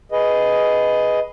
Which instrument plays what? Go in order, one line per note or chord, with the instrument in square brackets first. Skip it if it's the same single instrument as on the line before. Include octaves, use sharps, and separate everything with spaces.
[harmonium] G#4 B4 D#5